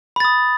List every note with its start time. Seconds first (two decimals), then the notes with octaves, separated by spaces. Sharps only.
0.16 B5
0.20 A6
0.25 D#6